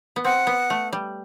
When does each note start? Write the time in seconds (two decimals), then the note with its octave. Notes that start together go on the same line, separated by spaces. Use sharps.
0.16 B3
0.25 C4 F#5
0.47 B3
0.70 A3
0.93 G3